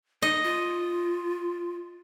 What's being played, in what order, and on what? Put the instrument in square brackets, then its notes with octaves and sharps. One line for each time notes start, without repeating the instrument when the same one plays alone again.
[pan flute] D#4 [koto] D#5
[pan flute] F4